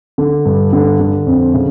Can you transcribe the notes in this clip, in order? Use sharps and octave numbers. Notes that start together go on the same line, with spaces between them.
D3
G2
D3
D3
F2
C#3